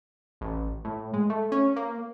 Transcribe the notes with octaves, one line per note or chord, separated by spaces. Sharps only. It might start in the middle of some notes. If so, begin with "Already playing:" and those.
A1
A2
G#3
A3
C#4
A#3